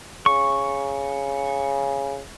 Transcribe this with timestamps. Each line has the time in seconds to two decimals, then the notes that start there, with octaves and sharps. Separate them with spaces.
0.26 C#3 C#6